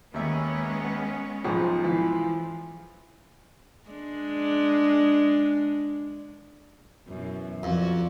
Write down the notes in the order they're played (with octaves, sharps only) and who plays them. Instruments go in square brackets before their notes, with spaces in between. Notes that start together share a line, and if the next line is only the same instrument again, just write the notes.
[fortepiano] D#2 E5 [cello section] G#3 B3 C#4
[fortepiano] B1 G#2 F3
[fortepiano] E3 [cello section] F3
[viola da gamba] G#3 D4
F#2 B2 E3
[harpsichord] F2 [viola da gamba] F#4 D5